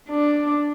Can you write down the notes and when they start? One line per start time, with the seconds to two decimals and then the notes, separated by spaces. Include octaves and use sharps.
0.10 D4